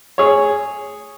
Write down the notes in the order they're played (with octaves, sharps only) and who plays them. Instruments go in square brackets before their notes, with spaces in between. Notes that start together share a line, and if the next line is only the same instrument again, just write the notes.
[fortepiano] G#4 C#5